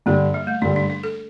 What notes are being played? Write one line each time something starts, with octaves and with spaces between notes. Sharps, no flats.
G2 D3 G3 A#3
G3
A3
G2 D3 G3 D4
D4
D4
A4